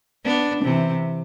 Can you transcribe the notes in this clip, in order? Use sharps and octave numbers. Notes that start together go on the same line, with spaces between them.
B3 D4
C3 E3